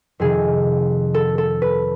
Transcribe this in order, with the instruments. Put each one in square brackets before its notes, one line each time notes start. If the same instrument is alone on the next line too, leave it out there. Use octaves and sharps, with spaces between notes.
[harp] F2 C3 D#3 G#4
A4
A4
B4